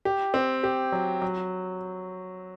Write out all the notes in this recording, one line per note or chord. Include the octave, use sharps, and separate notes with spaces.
G4
C4
G4
F#3
F#3